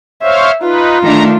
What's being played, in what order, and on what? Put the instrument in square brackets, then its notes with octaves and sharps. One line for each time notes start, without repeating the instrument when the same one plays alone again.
[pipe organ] C5 C#5 F5 [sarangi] E5
[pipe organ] D#4 B4 [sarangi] F4
[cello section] D#3 A3 D4 [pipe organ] A#5